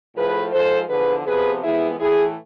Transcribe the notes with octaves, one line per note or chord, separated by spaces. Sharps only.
A2 F3 A3 G#4 B4
G#2 F3 G#3 A4 C5
E2 D3 F3 G#4 B4
F2 C3 F3 B3 G#4 B4
F2 E3 G#3 B3 E4 G#4
A2 E3 A3 E4 G#4